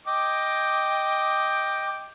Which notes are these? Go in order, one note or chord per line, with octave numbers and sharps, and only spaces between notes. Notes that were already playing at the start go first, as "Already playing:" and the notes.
D#5 G5 D6